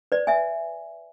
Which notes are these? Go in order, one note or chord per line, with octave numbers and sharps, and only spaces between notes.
B4 D5
E5 G#5